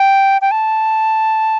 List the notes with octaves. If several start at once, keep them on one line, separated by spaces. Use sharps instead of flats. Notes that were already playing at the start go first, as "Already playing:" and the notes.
Already playing: G5
G5
A5